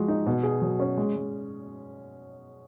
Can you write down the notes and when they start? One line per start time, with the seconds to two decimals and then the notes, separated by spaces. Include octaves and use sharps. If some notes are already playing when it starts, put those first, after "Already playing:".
Already playing: F3 G#3 F#4
0.08 D#4
0.27 B2
0.43 G#4
0.62 F#3
0.80 C#4
0.98 G#3
1.16 G#3